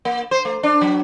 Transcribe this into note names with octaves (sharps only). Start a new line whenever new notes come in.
A#3
C5
A3
D4
F#3